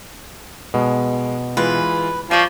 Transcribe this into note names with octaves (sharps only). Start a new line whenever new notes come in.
B2 G#3
E3 G#3 F4 B4
F3 C#5 D5 C7 D#7